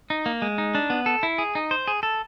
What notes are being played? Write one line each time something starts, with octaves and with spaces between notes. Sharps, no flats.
D#4
A#3
G#3
D#4
D4
B3
A4
E4
G#4
D#4
C5
G#4
A4